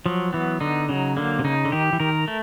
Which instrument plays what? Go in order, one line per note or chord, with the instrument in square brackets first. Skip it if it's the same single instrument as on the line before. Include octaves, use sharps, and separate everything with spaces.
[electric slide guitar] F3 [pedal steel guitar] F#3
[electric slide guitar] E3 [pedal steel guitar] B3
[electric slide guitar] D3 [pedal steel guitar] D#4
[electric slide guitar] C#3 [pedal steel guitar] F#3
[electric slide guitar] D3 [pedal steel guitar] A#3
[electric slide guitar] C3
[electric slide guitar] C#3 [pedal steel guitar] D#4
[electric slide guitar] D3
[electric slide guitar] D#3 [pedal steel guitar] G4
[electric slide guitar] E3
[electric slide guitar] D#3 [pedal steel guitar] A#4
[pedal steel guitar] A3